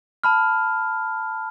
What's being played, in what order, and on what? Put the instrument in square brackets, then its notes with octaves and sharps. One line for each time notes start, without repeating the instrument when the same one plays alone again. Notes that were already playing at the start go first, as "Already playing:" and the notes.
[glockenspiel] A5 B5 F6